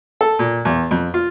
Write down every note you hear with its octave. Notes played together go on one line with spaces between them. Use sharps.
A4
A#2
E2
F2
F4